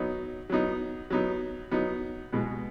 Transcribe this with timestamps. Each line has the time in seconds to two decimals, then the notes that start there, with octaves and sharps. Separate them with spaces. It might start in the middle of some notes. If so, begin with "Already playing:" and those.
Already playing: F#3 B3 D#4
0.50 F#3 B3 D#4
1.10 F#3 B3 D#4
1.71 F#3 B3 D#4
2.33 B2 G#3 B3